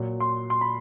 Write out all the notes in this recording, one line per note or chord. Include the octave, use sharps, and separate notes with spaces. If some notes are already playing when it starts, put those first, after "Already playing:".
Already playing: A#2 F#3
C6
C6
B5